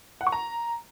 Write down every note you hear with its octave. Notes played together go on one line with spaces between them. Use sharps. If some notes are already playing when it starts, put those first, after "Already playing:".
F#5
C#6
A#5